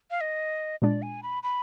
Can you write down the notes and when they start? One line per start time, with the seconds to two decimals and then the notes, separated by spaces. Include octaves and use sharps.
0.11 F5
0.21 D#5
0.82 A#2 G#3 D4 D5
1.02 G#5
1.23 B5
1.43 B5